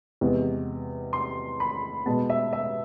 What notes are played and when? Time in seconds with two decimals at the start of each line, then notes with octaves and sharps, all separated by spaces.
0.21 E2 C3 G#3 B3
1.13 C6
1.60 B5
2.06 B2 G#3 B3 A5
2.30 E5
2.53 E5